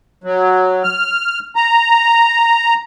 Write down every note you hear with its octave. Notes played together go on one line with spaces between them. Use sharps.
F#3
F6
A#5